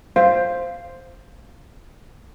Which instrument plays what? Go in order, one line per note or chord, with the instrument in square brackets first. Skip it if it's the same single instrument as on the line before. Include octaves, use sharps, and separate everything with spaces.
[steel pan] C5 [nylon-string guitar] F5